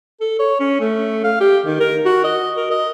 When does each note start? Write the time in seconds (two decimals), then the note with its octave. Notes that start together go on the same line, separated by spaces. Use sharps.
0.21 A4
0.40 C#5
0.60 C#4
0.81 A3
1.24 F5
1.41 G4
1.66 D#3
1.80 A#4
2.06 F#4
2.24 D#5
2.57 A#4
2.71 D#5